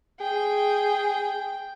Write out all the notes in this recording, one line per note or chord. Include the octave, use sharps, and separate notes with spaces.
G#4 G5